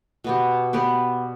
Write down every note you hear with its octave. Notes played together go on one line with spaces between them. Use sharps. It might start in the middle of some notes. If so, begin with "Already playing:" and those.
B2 B3 G4
B3 G4 B4 D5